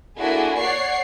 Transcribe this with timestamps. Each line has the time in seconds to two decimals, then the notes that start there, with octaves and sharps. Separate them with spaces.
0.17 A#3 D4 E4 F#4 G#4 A4
0.59 C#5 D5 F#5 C#6 C7